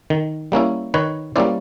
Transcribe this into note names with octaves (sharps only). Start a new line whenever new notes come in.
D#3
G3 A#3 C#4 E4
D#3 B4 C#5
G3 A#3 C#4 E4 C5 D5